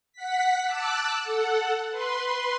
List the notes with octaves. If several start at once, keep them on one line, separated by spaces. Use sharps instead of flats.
F#5 B6
A5 D6 E6 F#6
A4 F#5
B4 C6